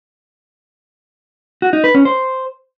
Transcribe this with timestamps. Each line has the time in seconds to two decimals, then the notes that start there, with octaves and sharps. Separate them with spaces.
1.62 F#4
1.73 D#4
1.84 B4
1.95 C#4
2.05 C5